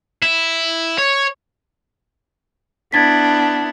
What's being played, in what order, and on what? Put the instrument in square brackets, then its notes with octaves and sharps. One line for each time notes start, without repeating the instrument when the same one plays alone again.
[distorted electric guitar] E4
C#5
[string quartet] B3 D4 E4 [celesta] G#6 A6 B6